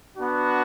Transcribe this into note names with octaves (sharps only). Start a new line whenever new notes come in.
B3 D4 F#4